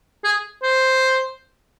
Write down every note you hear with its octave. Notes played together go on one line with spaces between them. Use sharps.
G#4
C5